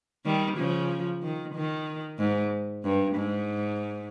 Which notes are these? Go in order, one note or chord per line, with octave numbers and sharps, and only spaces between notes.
D#3 G3
C#3 F3
D#3
D#3
G#2
G2
G#2